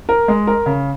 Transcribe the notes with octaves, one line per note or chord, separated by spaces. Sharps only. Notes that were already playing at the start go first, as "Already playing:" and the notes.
A#4
G#3
A#4
C#3